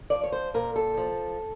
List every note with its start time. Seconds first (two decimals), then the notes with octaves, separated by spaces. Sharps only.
0.10 F3 D5
0.24 C#5
0.32 C5
0.54 A#2 A#4
0.76 A4
0.97 F3